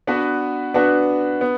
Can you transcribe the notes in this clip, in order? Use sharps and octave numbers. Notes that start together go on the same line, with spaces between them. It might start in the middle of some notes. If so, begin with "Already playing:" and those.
B3 D4 F#4 B4
B3 D4 F#4 B4
B3